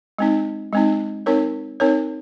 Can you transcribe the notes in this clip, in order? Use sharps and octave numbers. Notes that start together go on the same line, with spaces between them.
G#3 C4 D#4
G#3 C4 D#4
C4 D#4 A#4 C#5
C4 D#4 A#4 C#5